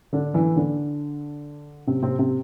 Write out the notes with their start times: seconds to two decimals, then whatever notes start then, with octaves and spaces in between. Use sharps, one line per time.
0.13 D3 D4
0.34 E3 E4
0.56 D3 D4
1.87 C3 C4
2.02 C3 C4
2.19 C3 C4